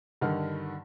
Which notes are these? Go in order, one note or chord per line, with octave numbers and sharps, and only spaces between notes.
G2 D3 D#3 F6